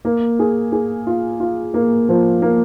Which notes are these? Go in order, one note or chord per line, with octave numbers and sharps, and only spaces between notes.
A#3
G#4
G#4
F4
F4
A#3
F3
A#3